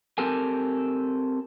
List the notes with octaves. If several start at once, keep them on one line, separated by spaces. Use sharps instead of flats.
C4 G4 A4 A#4 G#5